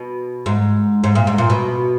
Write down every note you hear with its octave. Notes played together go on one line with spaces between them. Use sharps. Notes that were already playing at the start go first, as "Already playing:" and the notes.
Already playing: B2
G#2
G#2
A#2
G#2
A#2
B2